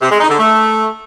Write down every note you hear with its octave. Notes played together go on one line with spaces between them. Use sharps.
C3
G#3
D#4
D3
A3